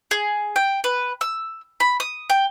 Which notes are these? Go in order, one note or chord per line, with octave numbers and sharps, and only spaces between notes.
G#4
G5
B4
E6
B5
D#6
G5